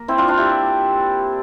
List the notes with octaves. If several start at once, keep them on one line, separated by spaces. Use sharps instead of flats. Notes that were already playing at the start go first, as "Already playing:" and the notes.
Already playing: A#3
C4 E4
D4 F4
D4 F4
E4 G4